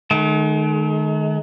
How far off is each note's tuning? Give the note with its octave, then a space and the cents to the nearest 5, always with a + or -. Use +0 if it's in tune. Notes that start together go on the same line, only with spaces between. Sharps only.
D#3 -25 G#3 +45